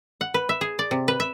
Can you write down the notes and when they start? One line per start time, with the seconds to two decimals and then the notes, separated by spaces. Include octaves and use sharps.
0.21 F#5
0.34 B4
0.49 E5
0.61 G#4
0.79 D5
0.91 C3
1.08 B4
1.20 E5